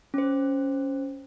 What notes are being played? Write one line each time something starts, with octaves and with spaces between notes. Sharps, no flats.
C#4 C5